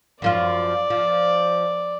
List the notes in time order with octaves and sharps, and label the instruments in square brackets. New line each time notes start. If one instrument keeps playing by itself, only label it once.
[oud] F#2 F3 F4 [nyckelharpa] D5
[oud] F3